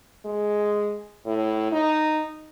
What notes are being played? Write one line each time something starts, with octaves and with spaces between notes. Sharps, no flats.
G#3
A2
D#4